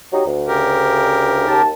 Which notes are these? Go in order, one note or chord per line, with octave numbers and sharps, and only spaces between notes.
F#3 D#4 G4
D2
C#3 G4 A#4
D#2 A5